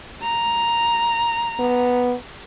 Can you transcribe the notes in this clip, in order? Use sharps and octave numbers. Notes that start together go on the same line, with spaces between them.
A#5
B3